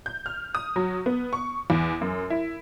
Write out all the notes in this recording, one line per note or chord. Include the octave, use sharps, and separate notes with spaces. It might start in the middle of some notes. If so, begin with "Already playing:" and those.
G6
F6
D#6
F#3
B3
C#6
E2
F#2
E4